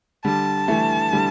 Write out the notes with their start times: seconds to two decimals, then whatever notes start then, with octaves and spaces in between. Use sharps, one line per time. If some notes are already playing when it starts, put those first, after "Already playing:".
0.25 D3 G3 A5
0.68 E3 A3
1.13 D3 G3